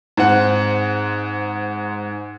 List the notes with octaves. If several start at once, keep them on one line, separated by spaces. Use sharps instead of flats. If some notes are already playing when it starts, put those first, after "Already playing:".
G#2 C4 F#5